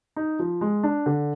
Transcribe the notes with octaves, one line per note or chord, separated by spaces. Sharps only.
D#4
F3
G#3
D4
D3